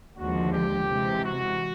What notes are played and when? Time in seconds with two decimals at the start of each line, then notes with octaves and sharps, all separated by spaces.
0.17 D#2 D3 F3 G#3 F#4
0.53 G4
0.89 C3 E3 G#3
1.25 F#4